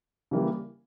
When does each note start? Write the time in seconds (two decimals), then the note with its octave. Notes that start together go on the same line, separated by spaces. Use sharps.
0.31 C#3 E3 G3 A#3